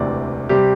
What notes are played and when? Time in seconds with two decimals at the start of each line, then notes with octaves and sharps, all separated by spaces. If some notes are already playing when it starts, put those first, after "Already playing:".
Already playing: E1 D2 C3 E3 D5
0.49 C3 G3 G4